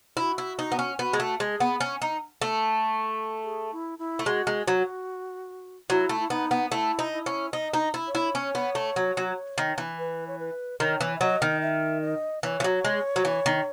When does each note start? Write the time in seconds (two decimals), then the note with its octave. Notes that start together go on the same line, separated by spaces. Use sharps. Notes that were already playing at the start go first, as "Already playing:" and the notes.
0.17 E4 F#4
0.38 E4
0.59 D#4
0.72 B3
0.79 C#4
0.99 B3 F#4
1.13 G#3
1.20 A3
1.40 G#3 G#4
1.60 B3
1.81 C#4
2.02 D#4
2.42 A3
3.44 G#4
3.72 E4
3.99 E4
4.19 A3
4.26 G#3 F#4
4.47 G#3
4.67 F#3 F#4
5.90 F#3 E4
6.09 A3
6.20 E4
6.30 B3 D#4
6.51 B3
6.71 A3 E4
6.99 D#4
7.12 E4
7.26 C#4
7.53 D#4 D#5
7.74 D#4
7.94 E4
8.07 C#5
8.15 E4
8.35 C#4
8.55 B3
8.75 A3
8.96 F#3
9.17 F#3
9.58 D#3
9.78 E3
9.99 B4
10.27 C#5
10.39 B4
10.80 D#3 C#5
11.01 E3
11.16 E5
11.21 F#3 D#5
11.42 D#3
11.62 E5
12.02 D#5
12.43 E3 C#5
12.60 E3
12.64 F#3
12.85 G#3
13.16 F#3
13.25 E3
13.46 D#3